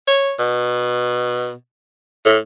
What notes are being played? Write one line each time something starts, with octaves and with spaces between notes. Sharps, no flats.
C#5
B2
A2